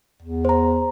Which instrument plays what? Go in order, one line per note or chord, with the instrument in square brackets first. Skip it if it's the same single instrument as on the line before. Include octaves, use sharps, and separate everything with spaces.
[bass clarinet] E2
[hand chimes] C5 A#5